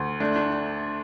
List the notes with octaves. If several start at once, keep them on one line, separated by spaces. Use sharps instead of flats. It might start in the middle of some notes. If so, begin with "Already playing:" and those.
Already playing: D2
A3 D4
D4